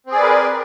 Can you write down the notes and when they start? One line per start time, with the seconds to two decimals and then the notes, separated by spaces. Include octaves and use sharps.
0.07 C4
0.11 G#4
0.15 D5
0.19 B4
0.23 A#4